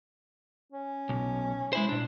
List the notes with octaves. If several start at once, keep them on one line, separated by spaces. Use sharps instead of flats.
C#4
B1
G#3 E4 C5
A#2 D4